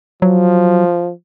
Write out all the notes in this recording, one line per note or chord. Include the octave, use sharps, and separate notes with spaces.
F3 F#3